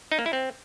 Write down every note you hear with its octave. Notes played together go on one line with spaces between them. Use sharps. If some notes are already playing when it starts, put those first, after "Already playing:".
D#4
A#3
E4
C4